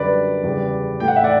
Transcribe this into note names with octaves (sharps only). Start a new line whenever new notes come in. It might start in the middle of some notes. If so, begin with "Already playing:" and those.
Already playing: F#2 D3 G3 B4 D5
E2 C#3 G3
A2 E3 A3 G5
F#5
E5
D5 F#5